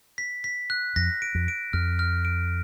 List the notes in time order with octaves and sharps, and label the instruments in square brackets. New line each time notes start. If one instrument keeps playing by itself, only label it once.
[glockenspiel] B6
B6
F#6
[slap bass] F2 [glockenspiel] A#6
[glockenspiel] D7
[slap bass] F2
[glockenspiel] D7
[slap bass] F2 [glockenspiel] F6
[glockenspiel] F6
D7